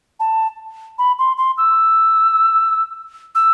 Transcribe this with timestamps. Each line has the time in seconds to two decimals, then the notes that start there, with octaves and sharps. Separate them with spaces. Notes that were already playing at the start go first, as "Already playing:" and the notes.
0.20 A5
0.98 B5
1.19 C6
1.38 C6
1.58 E6
3.35 E6